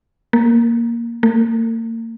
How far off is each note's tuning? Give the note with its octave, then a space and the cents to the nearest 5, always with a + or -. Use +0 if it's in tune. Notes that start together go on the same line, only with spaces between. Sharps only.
A#3 +0
A#3 -40